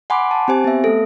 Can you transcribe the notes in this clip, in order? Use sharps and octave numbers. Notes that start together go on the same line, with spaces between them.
F#5 G#5 B5 C6 D6
A5
C4 G4 C5 G#5
B3 E5
A3 B3 A4